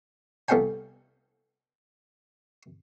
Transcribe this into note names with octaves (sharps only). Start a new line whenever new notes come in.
C2 B3 A4 F5 G5 G#5